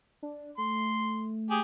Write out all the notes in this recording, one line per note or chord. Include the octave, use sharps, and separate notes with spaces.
D4
A3 C6
G4 G#4